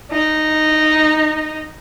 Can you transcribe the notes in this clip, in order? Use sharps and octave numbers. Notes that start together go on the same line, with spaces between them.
D#4